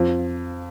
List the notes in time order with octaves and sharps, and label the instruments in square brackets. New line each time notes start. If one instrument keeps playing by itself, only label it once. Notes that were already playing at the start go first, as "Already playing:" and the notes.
Already playing: [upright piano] F2